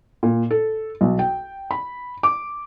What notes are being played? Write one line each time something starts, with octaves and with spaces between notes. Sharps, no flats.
A#2
A4
B1
G5
B5
D6